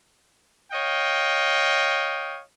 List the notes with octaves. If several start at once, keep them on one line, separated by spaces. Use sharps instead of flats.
C#5 D#5 F5 G5